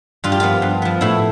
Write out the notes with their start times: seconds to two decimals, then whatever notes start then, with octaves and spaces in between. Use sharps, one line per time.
0.24 G2 F4
0.32 G4
0.40 F3 B3 F4
0.62 G2
0.82 F3 B3
1.01 A2 E4